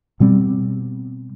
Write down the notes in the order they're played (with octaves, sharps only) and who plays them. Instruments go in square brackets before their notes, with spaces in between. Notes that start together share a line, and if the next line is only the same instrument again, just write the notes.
[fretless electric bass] B2 G3 C4